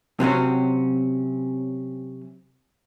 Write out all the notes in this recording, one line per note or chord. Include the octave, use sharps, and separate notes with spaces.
C3 F#3 C4 C#4